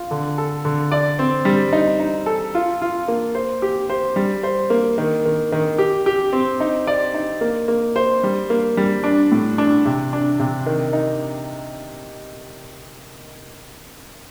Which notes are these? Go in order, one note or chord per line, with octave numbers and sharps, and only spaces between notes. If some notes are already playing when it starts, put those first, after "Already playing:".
Already playing: F4
D3
A4
D3
D5
C4
G3
D#4
D#4
A4
F4
F4
A#3
C5
G4
C5
G3
C5
A#3
D#3
D#3
D#3
G4
G4
C4
D#4
D5
D#4
A#3
A#3
C5
G3
A#3
G3
D4
A2
D4
C3
D4
C3
D#3
D#4